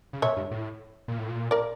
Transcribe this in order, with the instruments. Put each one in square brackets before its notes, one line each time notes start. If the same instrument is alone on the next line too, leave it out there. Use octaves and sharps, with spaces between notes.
[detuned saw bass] C#3
[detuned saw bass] A#2 [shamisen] C#5 E5
[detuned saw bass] G2
A2
A#2
A2
A#2
[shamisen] A#4 D5